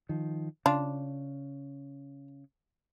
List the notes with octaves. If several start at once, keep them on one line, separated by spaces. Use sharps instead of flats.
D#3 F3
C#3 D4 F4